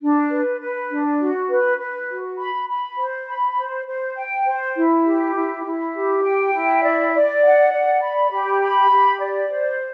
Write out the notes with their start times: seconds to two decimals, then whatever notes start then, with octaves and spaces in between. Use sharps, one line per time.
0.01 D4
0.31 B4
0.60 B4
0.90 D4
1.20 F#4
1.49 B4
1.79 B4
2.09 F#4
2.39 B5
2.68 B5
2.98 C5
3.27 B5
3.57 C5
3.87 C5
4.16 G5
4.46 C5
4.75 E4
5.06 G4
5.35 E4
5.65 E4
5.94 G4
6.24 G5
6.54 E4
6.83 D5
7.13 D5
7.43 F#5
7.72 D5
8.02 B5
8.32 G4
8.61 B5
8.91 G4
9.20 D5
9.50 C5